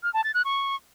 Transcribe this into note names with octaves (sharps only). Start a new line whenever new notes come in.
F6
A5
A6
F#6
C#6